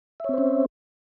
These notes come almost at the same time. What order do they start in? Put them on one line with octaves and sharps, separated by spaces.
E5 C#5 C4 C5 C#4